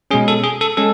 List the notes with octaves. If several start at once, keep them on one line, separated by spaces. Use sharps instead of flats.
B2 G#3 C#4 G#4
A4
G#4
A4
G#3 C#4 A4